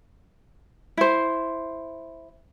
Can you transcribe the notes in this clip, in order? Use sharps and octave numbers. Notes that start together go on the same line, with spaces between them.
E4 C5